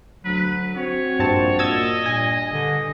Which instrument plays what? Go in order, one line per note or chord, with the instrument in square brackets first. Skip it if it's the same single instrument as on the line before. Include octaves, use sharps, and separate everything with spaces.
[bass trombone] D2 [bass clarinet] F#3 [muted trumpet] B4
[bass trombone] C4 [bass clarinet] F#4 [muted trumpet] C#5
[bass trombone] A#1 [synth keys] G2 C4 A5
[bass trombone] A#2 [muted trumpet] D#5 [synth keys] E6 G#6 A6
[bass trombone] G2 [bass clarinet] A#2 [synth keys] G#5
[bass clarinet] D3